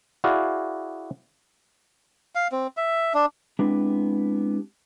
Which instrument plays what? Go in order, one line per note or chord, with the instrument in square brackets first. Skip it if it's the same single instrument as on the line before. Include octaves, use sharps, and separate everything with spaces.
[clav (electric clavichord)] E4 F#4 G#4 D5 F5
[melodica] F5
C4
E5
D4
[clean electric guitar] G#3 B3 C4 D4 E4 G4